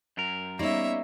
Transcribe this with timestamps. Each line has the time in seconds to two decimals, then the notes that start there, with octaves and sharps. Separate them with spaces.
0.17 F#2 A#4
0.59 G3 A#3 B3 C#4 D#4 C#5 E5